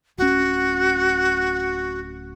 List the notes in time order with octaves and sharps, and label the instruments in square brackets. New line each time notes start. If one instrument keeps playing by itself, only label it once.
[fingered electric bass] D1 C#4 [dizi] F#4